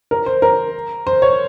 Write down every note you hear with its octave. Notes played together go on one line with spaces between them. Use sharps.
A#4
C5
A#4
C5
C#5